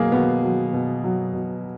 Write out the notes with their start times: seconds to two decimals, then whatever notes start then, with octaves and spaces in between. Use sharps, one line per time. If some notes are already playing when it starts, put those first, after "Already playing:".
Already playing: B2 F#3 A#3 G#4
0.12 B2 B3
0.43 F#3
0.73 B2
1.04 F#3
1.34 B2